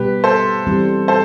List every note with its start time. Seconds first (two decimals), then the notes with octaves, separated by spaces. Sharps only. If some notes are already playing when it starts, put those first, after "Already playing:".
Already playing: B2 G3 B3 G4 B4
0.24 A4 C5
0.67 E3 G3 C4
1.08 A4 C5